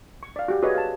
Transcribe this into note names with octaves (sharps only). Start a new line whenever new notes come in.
C#6
D5 F5
F#4 G4
F#4 G#4 B4 C#5 D#5
F5 A5